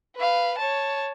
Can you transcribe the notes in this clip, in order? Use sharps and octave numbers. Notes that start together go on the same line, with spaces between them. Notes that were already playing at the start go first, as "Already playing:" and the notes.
B4 F5
C#5 A5